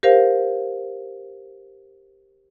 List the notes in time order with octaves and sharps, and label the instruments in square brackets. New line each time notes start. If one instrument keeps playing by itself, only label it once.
[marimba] G4 A#4 C5 F5